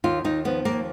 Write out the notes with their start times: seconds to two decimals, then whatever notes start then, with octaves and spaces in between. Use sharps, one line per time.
0.04 D#2 F4
0.24 D#2 D#4
0.45 F3 B3
0.65 D#2 A#3